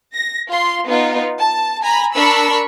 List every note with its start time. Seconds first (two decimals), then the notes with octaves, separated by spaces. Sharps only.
0.14 A#6
0.49 F4 C6
0.87 B3 D#4 F4
1.38 A5
1.82 G#5 A#5 B5
2.15 D4 A#4 B5 C#6 E6 B6